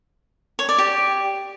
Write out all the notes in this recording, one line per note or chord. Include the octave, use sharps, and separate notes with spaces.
C#5
D5
G4